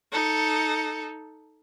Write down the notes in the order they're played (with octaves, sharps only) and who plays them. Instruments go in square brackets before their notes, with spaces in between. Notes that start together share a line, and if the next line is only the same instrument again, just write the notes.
[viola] D#4 A4